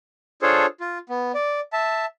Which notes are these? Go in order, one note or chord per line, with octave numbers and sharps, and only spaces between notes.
D4 F4 G#4 A4 C5 C#5
F4
B3
D5
E5 A5